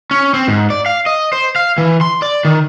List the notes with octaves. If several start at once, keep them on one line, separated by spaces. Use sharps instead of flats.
C#4
C4
G#2
D5
F5
D#5
C5
F5
E3
C6
D5
D#3